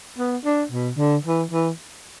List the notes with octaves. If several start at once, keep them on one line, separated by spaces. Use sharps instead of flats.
B3
D4
B2
D3
E3
E3